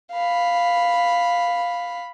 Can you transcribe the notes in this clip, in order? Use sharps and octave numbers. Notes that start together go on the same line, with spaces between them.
F5 B5